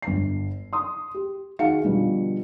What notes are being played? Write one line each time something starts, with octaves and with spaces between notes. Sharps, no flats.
G1 C7
C6 D#6
G4
D#3 F#4 G#4 F5 F#5 C#7
B2 D3 F3 G3